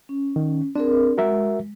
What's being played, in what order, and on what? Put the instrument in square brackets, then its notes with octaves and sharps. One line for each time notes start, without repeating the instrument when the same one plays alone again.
[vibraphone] C#4
[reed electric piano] D#3
[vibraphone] C4 G#4 A#4 [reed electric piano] D4
[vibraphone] G#3 [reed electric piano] F#4 A#4 E5